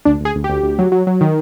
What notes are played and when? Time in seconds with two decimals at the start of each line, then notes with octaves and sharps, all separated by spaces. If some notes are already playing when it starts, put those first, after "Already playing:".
0.05 D2 D4
0.20 D2
0.25 G#4
0.35 D2
0.44 G4
0.49 D2
0.63 D2
0.79 F#3
0.92 F#3
1.07 F#3
1.21 D#3